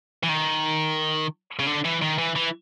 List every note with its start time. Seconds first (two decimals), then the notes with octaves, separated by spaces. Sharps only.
0.23 E3
0.29 D#3
1.59 C#3
1.67 D3
1.84 E3
2.02 D#3
2.18 E3
2.36 E3